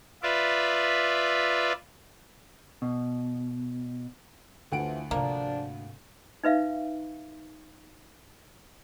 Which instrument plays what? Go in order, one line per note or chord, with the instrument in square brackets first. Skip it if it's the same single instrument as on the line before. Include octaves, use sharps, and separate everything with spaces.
[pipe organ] F4 B4 D5 E5
[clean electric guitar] B2
[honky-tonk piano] D2 F#5 D7 [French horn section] E3 F3
[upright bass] G#2 C3 [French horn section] F3 D4 [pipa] A#3
[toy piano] D#4 B4 E5 F5